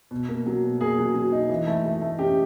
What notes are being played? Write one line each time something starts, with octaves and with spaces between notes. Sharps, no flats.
B2
A#3
F#3
B2
A#3 G#4
F#3
F#3
D#4
E3
A3
A3
A3
C#4 G4